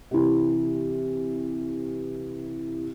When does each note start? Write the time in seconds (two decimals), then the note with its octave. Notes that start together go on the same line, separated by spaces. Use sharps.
0.11 C3 E3